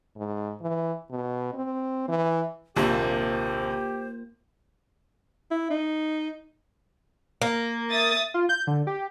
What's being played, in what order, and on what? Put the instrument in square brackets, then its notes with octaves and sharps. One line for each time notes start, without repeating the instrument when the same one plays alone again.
[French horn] G#2
E3
B2
C4
E3
[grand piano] D#1 A#1 C3 [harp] A#3 F4 [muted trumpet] G4 [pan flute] C5
[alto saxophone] E4
D#4
[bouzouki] A#3
[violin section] E5 D#6 A6
[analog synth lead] F4
G6
D3
G4